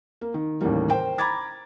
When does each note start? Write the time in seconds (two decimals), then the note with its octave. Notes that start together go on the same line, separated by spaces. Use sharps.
0.21 A#3
0.34 D#3
0.61 D#2 A2 C#3 E3 G3 A#3
0.90 A#4 C5 G5
1.18 A#5 B5 D6 G#6 A6